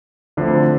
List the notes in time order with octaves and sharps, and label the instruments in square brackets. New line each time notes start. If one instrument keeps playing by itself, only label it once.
[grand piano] D2 D3 F3 C4